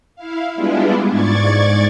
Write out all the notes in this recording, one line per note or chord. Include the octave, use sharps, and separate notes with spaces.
E4 F5
G3 G#3 B3 D4 E4 F4
G#2 D5 C#6 G#6 A6